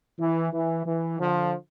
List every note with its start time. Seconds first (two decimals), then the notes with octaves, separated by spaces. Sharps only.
0.19 E3
0.52 E3
0.85 E3
1.19 D3 F3